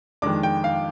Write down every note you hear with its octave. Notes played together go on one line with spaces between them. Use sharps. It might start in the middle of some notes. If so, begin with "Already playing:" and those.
F2 D#3 G#3 D4 D6
G5
F5